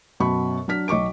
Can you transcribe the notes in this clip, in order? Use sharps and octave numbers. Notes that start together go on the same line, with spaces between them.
F#2 B2 B5 C#6
F#3 D4 F6 B6
B1 D#5 C#6 D6 D7